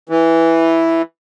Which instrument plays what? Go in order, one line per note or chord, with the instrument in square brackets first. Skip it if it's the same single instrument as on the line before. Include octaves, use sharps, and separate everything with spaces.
[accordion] E3